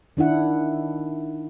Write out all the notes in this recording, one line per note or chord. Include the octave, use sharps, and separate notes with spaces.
D#3 D4 E4 F#5